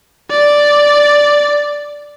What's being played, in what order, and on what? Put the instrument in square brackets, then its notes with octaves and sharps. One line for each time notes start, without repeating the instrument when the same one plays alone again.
[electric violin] D5